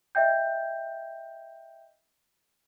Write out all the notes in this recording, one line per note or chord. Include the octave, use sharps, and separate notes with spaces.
D#5 E5 G5 G6